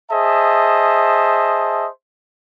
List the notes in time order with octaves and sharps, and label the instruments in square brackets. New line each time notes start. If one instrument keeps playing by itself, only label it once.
[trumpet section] G#4 C5 D#5 E5 A5